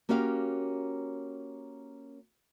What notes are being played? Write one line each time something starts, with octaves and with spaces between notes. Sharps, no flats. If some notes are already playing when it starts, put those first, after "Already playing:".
A#3 C#4 F#4 G4 F5